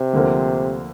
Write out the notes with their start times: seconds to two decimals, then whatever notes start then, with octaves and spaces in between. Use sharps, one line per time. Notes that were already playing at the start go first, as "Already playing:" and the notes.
Already playing: C3
0.13 D2 D3 F3 A#3